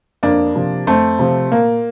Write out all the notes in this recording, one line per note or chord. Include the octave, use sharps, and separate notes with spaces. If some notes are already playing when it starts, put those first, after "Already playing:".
F2 A#3 D4
C3 F3
F2 A3 C4
C3 F3
A#2 A#3